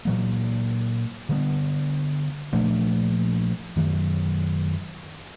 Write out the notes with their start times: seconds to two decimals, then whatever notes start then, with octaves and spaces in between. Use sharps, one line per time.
0.05 A#2 F#3 A#3
1.29 D3 G3 B3
2.53 A#2 F3 A3 D4
3.76 F#2 D#3 F#3